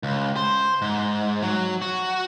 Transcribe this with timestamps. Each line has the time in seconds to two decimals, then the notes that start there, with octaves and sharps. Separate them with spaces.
0.03 C#2
0.36 C5
0.82 G#2
1.42 F#3
1.82 F#4